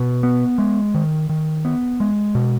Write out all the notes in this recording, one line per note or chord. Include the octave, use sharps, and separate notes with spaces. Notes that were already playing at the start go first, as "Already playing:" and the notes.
Already playing: B2
B3
G#3
D#3
D#3
B3
G#3
B2